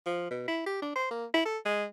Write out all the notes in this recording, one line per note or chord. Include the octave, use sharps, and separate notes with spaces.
F3
B2
E4
G4
D4
C5
A#3
E4
A4
G#3